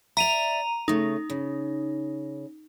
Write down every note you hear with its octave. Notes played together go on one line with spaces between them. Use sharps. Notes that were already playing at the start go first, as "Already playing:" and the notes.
D5 E5 A#5 D#7 F7
C#3 A3 D#4
C#3